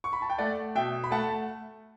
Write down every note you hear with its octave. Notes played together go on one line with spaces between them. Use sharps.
C#6
B5
A5
G5
A3 D5 F#5
B2 E5 G5
B5
A3 F#5 A5